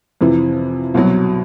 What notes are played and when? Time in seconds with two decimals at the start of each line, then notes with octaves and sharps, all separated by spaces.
0.21 F2 C3 E3
0.94 C2 B2 F#3